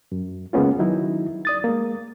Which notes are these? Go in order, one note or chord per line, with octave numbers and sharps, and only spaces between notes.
F#2
C#3 G#3 A#3 B3 C#4 F4
D#3 F#3 D#4 E4
D5 D#6 A6
G#3 A#3